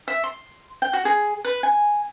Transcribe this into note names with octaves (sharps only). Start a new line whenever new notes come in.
E5
C6
G5
F#4
G#4
B4
G#5